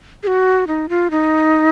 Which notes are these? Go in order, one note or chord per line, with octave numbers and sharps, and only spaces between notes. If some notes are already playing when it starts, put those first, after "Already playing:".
G#4
F#4
D#4
F4
D#4